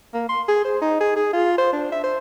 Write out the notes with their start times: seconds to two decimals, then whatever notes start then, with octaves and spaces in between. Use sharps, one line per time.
0.14 A#3
0.29 C6
0.48 G#4
0.64 C5
0.82 D#4
1.00 G#4
1.16 G#4
1.33 F4
1.58 C5
1.73 D4
1.92 E5
2.03 C5